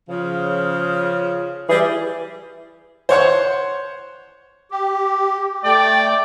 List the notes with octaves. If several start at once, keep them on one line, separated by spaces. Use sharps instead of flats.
C#3 F3
E3 G3 G#4
C5 C#5 F#5 C#6
G4
A3 D5 G5